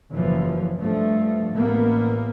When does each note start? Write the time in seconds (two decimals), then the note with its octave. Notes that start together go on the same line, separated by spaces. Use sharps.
0.12 F#1 E3 F3
0.81 G2 F3 A3
1.52 A1 A#3 B3